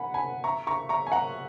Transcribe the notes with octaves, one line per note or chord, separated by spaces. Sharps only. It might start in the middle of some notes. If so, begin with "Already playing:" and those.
Already playing: F#5 G#5 B5
G#5 B5
E5 A#5 C#6
A#5 C#6
A#5 C#6
G#5
F#5 A#5